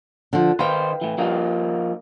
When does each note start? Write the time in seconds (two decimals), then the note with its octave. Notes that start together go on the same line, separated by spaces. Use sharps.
0.33 D3 F3
0.59 D#3 D#4 B4 C5 F5 G5
1.01 A2 E3
1.18 F3 A#3 D#4